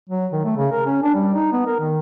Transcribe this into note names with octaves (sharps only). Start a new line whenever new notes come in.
F#3
D#3
A3
C#3
A#4
C#4
D4
G3
D#4
B3
A#4
D#3